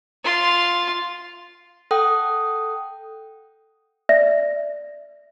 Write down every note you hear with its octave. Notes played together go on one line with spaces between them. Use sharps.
F4 C6
A4 F#5 G5 D#6
D5 E5 A#6